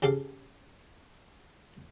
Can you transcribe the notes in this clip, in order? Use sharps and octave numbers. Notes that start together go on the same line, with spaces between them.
C#3 G4 A4 F5 D6